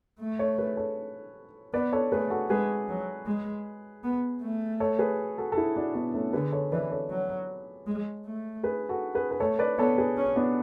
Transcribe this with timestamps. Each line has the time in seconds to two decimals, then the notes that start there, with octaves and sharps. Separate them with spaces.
0.20 A3
0.39 A4 C#5
0.58 G#4 B4
0.77 A4 C#5
1.73 B3 B4 D5
1.92 A4 C#5
2.12 A3 G#4 B4
2.30 F#4 A4
2.50 G#3 G#4 B4
2.89 F#3
3.26 G#3
4.04 B3
4.42 A3
4.80 A4 C#5
4.99 G#4 B4
5.38 F#4 A4
5.52 A4
5.57 E4 G#4
5.76 D4 F#4
5.95 B3 D4
6.14 A3 C#4
6.33 D3 G#4 B4
6.52 A4 C#5
6.72 E3 B4 D5
6.91 A4 C#5
7.10 F#3
7.87 G#3
8.25 A3
8.63 G#4 B4
8.89 F#4 A4
9.15 G#4 B4
9.31 B4
9.40 A3 A4 C#5
9.59 B4 D5
9.78 B3 A4 C#5
9.98 G#4 B4
10.17 C#4
10.36 B3 D4